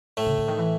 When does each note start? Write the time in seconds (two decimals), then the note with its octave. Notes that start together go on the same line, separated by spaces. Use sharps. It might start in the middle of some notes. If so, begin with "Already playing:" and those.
0.17 A2 A3
0.26 C#3
0.38 D3
0.48 D#3
0.58 E3